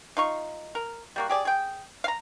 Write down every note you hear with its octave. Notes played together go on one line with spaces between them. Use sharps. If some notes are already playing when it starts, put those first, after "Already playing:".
D#4 F4 C#6
A#4
G3 A#3 F#4
G4 G#4 D5
G#4 G5
F5 A#5